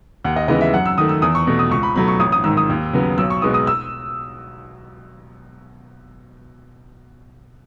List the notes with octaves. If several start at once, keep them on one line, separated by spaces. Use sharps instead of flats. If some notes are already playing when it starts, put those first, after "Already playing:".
D#2 F#5
D#5
C#3 E3 G#3 B3 D#5
E5
F#2 F#5
E6
D#3 A3 D#6
E6
E2 D#6
C#6
B2 A3
D#6
C#2 C#6
B5
B2 F#3 A3 B5
C#6
A1 D#6
D#6
G#2 D#3 E6
D#6
D#2
C#3 F#3 B3
B1 E6
C#6
B2 G#3 B3 D#6
D#6
E6